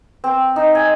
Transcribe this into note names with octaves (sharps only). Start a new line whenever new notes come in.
C4
D#4
G#5